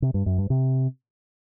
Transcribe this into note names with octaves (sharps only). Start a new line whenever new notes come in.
C3
G2
F#2
G2
C3